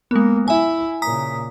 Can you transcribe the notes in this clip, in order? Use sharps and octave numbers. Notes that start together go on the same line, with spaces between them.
G#3 A#3 B3
E4 E5 G#5
A#2 C#3 A#5 D#6 B6